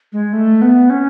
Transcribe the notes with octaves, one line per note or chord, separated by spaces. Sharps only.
G#3
A3
B3
C#4